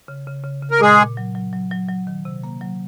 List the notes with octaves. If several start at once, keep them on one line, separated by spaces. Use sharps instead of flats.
C#3
C#3
C#3
C#3
A#4
A#2 G#3 G#4
A#2
F#3
F#3
F#3
F#3
F#3
D#3
C3
A#3
F#3